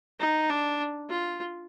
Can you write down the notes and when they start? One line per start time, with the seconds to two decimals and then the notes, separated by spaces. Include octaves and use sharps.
0.19 D#4
0.50 D4
1.10 F4